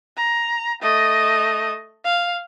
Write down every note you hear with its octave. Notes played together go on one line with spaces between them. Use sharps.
A#5
A3 D#5
F5